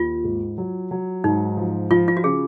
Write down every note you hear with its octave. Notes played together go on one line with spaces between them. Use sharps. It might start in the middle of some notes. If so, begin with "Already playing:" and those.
Already playing: D#2 F4
G#2
F#3
F#3
G#2 D#4
F3
F3 F4
F4
F#4
C#3 G#4